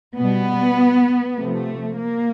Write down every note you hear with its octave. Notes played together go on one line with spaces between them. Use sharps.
B2 G3 B3
C3 F3 A3
A#3